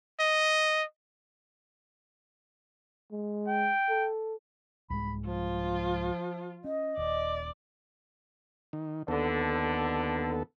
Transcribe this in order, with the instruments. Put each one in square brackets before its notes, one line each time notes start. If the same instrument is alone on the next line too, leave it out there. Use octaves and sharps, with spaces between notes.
[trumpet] D#5
[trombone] G#3
[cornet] G5
[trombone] A4
[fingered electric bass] C2 G#2 G#3 [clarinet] B5
[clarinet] F3 [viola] F4
[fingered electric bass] C#4 [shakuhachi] D#5
[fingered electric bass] D#1 [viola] D5
[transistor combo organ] D#3
[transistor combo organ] D#2 B3 A4 [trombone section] D3